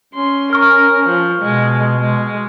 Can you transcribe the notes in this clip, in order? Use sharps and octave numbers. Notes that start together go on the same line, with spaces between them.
C#4 C6
A#4 C#6 F6
F3
B2 G#3
G#3